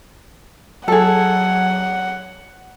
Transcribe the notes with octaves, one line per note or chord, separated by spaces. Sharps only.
F#3 G#4 A4 F#5